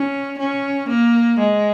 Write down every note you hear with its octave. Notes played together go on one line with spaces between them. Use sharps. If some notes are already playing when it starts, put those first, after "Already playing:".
Already playing: C#4
C#4
A#3
G#3